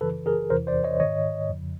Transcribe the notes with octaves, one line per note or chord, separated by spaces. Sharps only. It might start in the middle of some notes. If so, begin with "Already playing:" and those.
F#2 C#3 E3 A4 B4
G#4 A#4
E2 C3 E3 A#4 C5
C5 D5
C#5 D#5
G#2 D#3 C#5 D#5
F2 C#3 F3